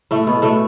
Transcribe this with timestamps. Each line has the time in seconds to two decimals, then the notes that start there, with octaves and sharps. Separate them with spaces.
0.11 A2 A3
0.27 B2 B3
0.42 A2 A3